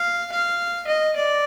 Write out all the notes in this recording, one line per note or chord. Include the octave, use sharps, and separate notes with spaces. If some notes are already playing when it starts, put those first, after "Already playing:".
Already playing: F5
F5
D#5
D5